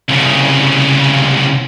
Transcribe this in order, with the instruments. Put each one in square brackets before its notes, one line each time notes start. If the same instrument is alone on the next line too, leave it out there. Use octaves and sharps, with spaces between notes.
[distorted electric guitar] C2 C#3